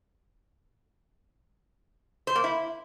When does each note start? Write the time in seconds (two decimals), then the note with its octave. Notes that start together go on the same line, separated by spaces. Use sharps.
2.27 C5
2.35 A#3
2.44 E4